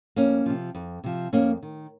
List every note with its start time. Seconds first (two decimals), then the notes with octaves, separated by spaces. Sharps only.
0.16 F2 A#3 C#4
0.46 C3 F3
0.75 F2
1.04 C3 F3
1.33 F2 A#3 C#4
1.63 D#3